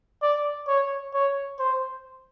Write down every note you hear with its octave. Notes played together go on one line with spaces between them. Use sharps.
D5
C#5
C#5
C5